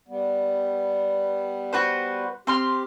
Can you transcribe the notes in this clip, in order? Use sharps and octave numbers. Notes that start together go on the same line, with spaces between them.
G3 B3
F#4 B4 C5
C4 G4 C6 F6